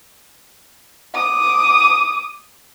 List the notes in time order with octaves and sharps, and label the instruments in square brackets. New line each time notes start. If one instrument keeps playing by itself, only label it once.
[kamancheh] D6 D#6